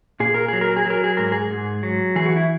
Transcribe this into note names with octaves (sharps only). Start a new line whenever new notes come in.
A#2 G#4
A#4
F#3 G#4
A#4
G#4
F#3 A#4
G#4
G#2 A#4
G#4
G#2
F#3
E3 G#4
F#4
E4